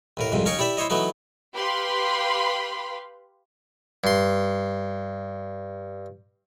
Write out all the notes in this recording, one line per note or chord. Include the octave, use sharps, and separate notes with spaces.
D#2 A2 A#4
C2 F2 G#2 C3
D#2 C#4 D#4 A#4 G#5 C#6
E4 G4 D5 E5
E4 C5 C#5 D#5
E3 F#3 A3 B3 D#4
G4 B4 F5 B5 C6
G2 C6